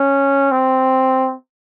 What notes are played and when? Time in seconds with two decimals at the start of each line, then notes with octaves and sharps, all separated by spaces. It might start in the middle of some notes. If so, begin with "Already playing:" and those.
Already playing: C#4
0.51 C4